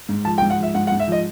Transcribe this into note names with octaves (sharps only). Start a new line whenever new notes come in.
G#2
F3 A5
G5
G#2
F#5
F3 E5
G#2 F#5
F#5
G#2
E5
F3 D#5